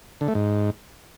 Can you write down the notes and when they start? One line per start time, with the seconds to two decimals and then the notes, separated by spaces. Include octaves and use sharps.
0.21 D3
0.28 A3
0.35 G#2